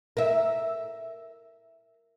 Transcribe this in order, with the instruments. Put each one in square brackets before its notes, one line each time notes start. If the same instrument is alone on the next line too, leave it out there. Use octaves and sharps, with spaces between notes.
[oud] A#4 E5